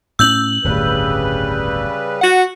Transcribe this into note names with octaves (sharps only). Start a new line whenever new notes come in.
A2 C4 C#4 E6 G6 F#7
D1 G1 A2 C#3 G3 B4
F#4 F#5